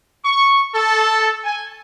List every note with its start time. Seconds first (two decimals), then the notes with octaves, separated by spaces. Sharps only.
0.25 C#6
0.75 A4
1.44 G#5